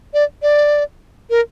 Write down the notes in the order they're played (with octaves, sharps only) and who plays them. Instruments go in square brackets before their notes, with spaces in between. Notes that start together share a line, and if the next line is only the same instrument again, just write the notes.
[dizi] D5
D5
A#4